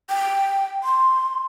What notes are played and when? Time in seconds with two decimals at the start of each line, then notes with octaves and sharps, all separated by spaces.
0.09 G5
0.83 C6